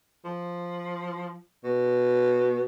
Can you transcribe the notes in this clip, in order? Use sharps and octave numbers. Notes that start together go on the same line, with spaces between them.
F3
B2